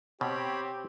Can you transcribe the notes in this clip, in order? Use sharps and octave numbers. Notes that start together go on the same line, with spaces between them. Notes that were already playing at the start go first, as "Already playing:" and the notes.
B2 C4 G4 C#5 B5